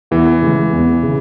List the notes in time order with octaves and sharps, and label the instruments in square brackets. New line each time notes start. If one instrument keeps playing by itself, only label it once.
[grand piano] E2 [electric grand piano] E3
[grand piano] C#3 G#3
E2
C#3